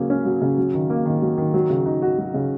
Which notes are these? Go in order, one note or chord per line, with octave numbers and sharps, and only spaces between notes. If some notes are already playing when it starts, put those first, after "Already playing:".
Already playing: C#3 F#3 A#3
C#4
F#3
C#3
F#3
D#3
A#3
D#3
F#3
D#3
F#3
C#3
D#4
F#4
F#3
C#3